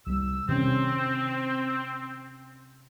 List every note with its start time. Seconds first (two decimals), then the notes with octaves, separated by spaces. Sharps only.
0.07 C2 G3 E6
0.49 C3 D#3 C4 C#4